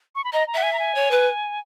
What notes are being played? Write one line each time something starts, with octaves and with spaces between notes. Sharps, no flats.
C#6
B5
D#5 A#5
A#5
E5 F#5
G#5
A#5
G#5
C#5
B4